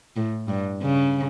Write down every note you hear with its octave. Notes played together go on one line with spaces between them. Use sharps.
A2
G2
C#3